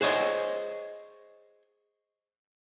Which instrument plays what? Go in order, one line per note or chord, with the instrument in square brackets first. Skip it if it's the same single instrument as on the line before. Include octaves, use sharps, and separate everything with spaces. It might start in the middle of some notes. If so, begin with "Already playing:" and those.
[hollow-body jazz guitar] G#4 C5 C#5 D#5